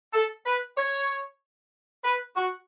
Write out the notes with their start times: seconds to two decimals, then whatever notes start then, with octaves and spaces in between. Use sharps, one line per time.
0.14 A4
0.46 B4
0.78 C#5
2.04 B4
2.36 F#4